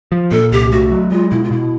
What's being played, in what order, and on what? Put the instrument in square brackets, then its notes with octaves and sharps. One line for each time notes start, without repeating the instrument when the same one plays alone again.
[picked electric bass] F3
[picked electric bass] A#2 [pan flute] A4
[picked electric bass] C2 [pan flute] G4
[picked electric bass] A3 [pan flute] F#4
[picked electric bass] F#3
[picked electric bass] G#3 [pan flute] F4
[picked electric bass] B2 [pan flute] E4
[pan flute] F4
[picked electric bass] B2 [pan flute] E4